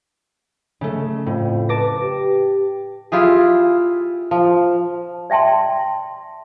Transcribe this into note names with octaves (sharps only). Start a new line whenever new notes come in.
C#3 A3
F2 A2
B4 A5 D6 A#6
G4
E4 F4 G4 G#4
F3
D5 E5 G5 A5 C6